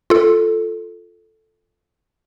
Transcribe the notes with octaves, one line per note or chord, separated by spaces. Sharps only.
F4 A4